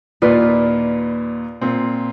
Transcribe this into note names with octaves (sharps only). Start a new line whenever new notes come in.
D#2 A#2 F4 B4 D5
A#2 C4